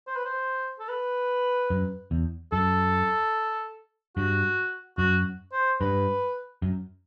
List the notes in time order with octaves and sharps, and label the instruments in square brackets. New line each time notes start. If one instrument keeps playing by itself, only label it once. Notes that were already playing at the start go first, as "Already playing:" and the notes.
[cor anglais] C5
B4
C5
A4
B4
[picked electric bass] F#2
E2
[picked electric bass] F#2 [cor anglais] A4
[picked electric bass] G2 [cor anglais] F#4
[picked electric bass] F#2 [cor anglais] F#4
[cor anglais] C5
[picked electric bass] G2 [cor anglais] B4
[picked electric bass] F#2